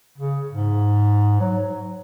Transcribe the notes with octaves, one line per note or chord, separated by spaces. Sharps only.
C#3
G#2
F#3